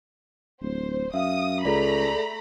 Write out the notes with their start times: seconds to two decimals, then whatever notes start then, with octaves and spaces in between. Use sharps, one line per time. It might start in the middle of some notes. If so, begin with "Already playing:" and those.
0.62 D1 C5
1.14 F#2 E5 F5 D#6
1.65 C#2 A3 G#4 A4 D5 A#5 B5